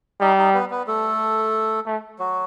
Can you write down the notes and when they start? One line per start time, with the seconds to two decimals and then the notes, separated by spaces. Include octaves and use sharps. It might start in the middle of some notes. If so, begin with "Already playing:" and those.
0.21 G3 D#4 D#5
0.38 D#4 D#5
0.54 B3 B4
0.70 B3 B4
0.87 A3 A4
1.86 A3
2.19 F#3 F#4